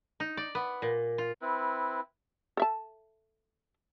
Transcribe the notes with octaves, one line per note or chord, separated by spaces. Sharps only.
D#4
D5
B3
A#2
F4
C4 E4 B4
A4 E5 A5